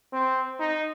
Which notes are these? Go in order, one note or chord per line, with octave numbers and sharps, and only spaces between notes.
C4
D#4